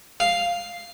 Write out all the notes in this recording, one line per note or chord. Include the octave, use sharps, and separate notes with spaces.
F5